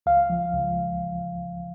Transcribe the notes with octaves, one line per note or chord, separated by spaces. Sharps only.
C#2 F5
F3
C#2